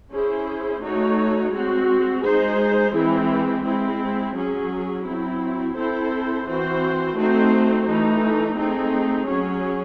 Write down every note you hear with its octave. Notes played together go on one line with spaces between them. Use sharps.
C#4 E4 G#4 C5
A3 D#4 F#4 C#5
G#3 C4 F#4
G#3 D#4 G#4 C5
E3 G#3 C4 E4
G#3 C4 E4
F#3 C#4 G#4
F#3 C4 E4
C4 E4 A4 C5
E3 C4 F#4 C5
A3 C4 D#4 F#4 C5
E3 A3 D#4
A3 C4 D#4 G#4
F#3 C#4 G#4 C#5